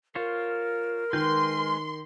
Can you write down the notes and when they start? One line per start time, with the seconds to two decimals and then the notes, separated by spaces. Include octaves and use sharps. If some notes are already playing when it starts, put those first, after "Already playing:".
0.15 F4 A#4 C5 C#5
1.13 D#3 G#3 B4 C6 G6